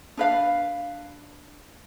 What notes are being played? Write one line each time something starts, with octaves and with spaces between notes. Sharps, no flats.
D4 B4 F5